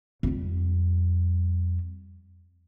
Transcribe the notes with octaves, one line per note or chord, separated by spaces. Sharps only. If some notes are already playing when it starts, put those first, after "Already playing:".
F2 G3